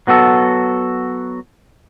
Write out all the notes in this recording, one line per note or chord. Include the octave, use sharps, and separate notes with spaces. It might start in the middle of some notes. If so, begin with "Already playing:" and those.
F#3 B3 F#4 A4